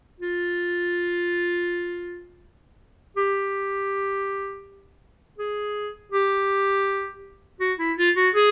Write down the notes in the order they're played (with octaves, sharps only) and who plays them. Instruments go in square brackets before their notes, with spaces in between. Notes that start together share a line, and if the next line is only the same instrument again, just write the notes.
[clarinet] F4
G4
G#4
G4
F#4
E4
F4
F#4
G#4